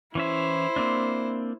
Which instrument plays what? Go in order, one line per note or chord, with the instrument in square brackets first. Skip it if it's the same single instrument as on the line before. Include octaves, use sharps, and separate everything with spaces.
[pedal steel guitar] E3 C#4 E5 [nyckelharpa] E4 C5
[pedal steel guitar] A#3 C4 D4